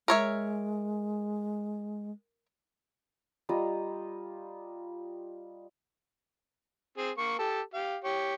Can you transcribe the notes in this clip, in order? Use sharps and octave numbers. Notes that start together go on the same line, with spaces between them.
G#3 A#4 C#5 E5
G3 F4 D#5 A#5
C4 G#4
A#3 C#6
G4 A4
G4 F5
G4 C#5